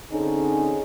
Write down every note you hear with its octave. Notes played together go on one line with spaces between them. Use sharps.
D3 C4 C#4 D#4 G#4